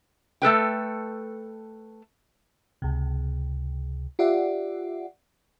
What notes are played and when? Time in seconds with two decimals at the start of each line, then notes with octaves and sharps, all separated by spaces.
0.42 A3 A4 B4 G5
2.82 C#2 C3
4.19 F4 G4 D5 E5 F#5